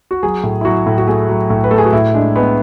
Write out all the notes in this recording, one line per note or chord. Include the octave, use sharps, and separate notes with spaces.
F#4
F#3 G#4
A2
E4
F#3 F#4
A2
F#4
A3 G#4
F#3
A2
B4
A3 A4
G#4
F#4
A2 E4
G#3 D4
G#3 B3